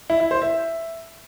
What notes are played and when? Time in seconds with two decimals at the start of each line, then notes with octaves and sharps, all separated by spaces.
0.10 E4
0.20 E4
0.31 C5
0.42 E5